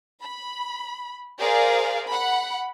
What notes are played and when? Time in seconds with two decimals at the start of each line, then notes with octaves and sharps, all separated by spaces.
0.22 B5
1.40 G#4 A#4 C5 D5 F5
2.09 F#5 B5